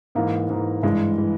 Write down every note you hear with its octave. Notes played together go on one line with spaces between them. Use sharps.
G#2 E3 A#3
G#2 E3
G2 E3 G#3
E3